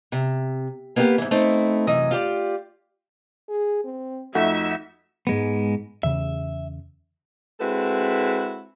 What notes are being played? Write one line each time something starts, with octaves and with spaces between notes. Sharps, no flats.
C3
A#3 B3 E4 F4 G4 B4
G#2 E3
A3 C4 D#4 E4
F#2 C3 E3 D#5
F4 G4 D5
G#4
C4
F2 A3 D#4 F#4 E5
G#2 G#3 B3
E2 C#3 E5
G#3 C4 E4 F#4 A4 B4